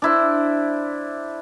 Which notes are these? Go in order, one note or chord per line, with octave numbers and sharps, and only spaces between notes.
D4 E4 C5